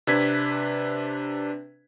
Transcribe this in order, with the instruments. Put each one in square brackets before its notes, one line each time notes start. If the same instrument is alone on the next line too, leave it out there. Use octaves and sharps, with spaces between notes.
[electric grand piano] C3 D4 B4 G#6 B6